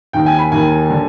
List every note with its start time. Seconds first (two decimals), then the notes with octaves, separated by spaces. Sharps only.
0.13 D#2 D#3 G5
0.26 G#5
0.39 B5
0.52 D#2 D#3 G#5
0.90 D3